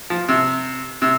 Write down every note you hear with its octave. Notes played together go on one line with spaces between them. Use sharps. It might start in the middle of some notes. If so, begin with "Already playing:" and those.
F3
C3
C3